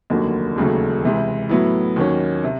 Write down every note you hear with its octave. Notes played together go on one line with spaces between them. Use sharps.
F1 D#2 D3 F#3 A#3
E1 D#2 C#3 F#3 A3
C#2 C3 E3
A2 F#3 B3 E4
D#2 D#3 F#3 A#3 C#4
C3